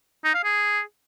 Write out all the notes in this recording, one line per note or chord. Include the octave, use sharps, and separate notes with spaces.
D#4
F5
G#4